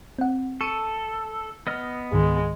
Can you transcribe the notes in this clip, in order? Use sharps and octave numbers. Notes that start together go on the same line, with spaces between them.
C4 F#5
A4 C#6 C#7 D#7
B3 D#5 F6
C#2 G#2 D#3 G#3